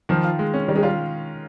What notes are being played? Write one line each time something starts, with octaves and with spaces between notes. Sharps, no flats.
D#3 F3
F4
G#3
C#4
D#3 G3
G#3
G3 F4